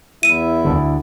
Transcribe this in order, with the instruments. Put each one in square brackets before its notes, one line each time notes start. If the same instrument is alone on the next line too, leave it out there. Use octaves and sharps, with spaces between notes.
[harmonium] E2 E5 [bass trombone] E4 [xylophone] D#7
[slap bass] D2 D3